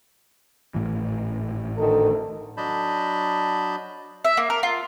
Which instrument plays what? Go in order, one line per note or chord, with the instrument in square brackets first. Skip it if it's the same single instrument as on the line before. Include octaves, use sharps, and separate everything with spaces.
[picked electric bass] G#1 A2 E3
[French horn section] D2 D#3 A4
[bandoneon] F#3 D4 D#5 A5 B5 G6
[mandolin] E5
A#3
A#4
F4